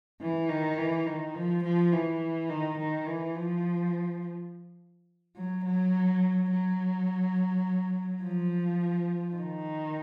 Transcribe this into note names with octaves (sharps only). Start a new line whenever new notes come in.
E3
D#3
E3
D#3
F3
F3
E3
D#3
D#3
E3
F3
F#3
F#3
F#3
F3
D#3